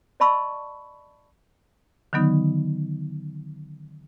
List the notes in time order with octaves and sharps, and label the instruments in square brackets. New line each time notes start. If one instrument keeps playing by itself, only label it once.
[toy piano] D5 D#5 A5 B5 C#6 E6
[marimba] D3 D#3 F#3 B3 D#4